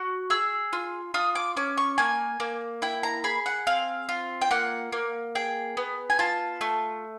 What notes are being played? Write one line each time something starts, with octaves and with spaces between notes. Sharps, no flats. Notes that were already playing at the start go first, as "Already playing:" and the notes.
Already playing: F#4
G#4 E6
F4
F4 D#6
D6
C#4 D6
C#6
A#3 G#5
A#3
E4 G5
A#5
G#4 B5
F#5
C4 F5
F4
G5
A#3 F#5
A#3
G#4 G5
B3
G#5
F4 A5
A3